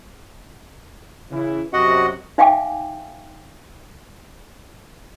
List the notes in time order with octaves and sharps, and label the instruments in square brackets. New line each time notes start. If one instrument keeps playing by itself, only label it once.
[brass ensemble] C#3 E3 E4
[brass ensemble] F#2 C3 [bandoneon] F#4 D#5 F#5
[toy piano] D#4 E5 F5 G5 G#5 D6